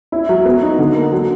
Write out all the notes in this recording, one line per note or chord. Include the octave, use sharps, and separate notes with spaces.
E4
F#3
B3
D#4
D3
A#3
F#3